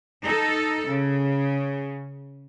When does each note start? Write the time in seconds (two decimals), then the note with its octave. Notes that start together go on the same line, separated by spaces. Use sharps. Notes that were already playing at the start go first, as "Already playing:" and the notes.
0.24 D#4 A4
0.89 C#3